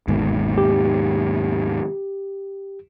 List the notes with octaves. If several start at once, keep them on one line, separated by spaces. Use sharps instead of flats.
G1 D#2 G#2 B2
G4